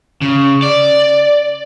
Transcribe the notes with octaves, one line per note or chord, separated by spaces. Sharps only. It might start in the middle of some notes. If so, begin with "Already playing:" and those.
C#3
D5